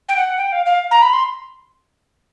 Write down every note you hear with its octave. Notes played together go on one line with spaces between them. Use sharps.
G5
F#5
G5
F5
F5
A#5
B5
C6